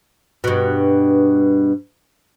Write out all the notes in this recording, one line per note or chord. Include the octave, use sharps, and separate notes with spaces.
G2 B2